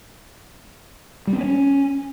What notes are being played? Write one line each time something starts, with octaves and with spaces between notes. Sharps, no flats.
G3
C4
B3
C#4